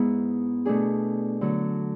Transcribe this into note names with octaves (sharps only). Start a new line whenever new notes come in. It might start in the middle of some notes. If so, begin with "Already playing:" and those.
Already playing: G#2 G#3 B3 E4
B2 A3 D4 G#4
D3 F#3 A3